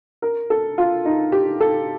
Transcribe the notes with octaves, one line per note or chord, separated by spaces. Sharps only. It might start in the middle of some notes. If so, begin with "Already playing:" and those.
A#4
A4
F4
D#4
G4
A4